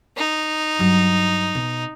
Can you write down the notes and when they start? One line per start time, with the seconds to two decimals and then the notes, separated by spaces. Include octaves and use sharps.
0.17 D#4
0.79 G2 F#3
1.55 B2